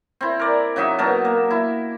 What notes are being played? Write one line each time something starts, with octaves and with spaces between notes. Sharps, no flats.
C4 E4
A#4 D5
C#3 F#3 D#4 E5
B2 F#3 A#4 A5
A#3
E4